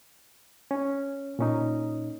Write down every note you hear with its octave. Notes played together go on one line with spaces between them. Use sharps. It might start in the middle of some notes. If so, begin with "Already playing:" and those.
C#4
A#2 C#4 D#4